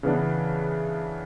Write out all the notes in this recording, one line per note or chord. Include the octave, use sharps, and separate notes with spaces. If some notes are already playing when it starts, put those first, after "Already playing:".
C#3 E3 B3 D4